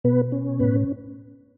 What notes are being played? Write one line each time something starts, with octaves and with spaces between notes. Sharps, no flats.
B2 B3 B4
C#4
A2 B3 B4